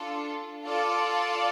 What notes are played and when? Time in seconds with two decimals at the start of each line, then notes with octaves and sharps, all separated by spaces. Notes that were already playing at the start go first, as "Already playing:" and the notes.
Already playing: D4 F4 A4
0.64 F4 A4 D5